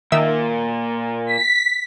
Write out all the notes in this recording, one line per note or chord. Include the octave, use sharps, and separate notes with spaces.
A#2 D#3 A#3 E5 E6
B6